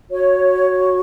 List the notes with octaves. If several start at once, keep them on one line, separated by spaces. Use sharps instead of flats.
F#4 C#5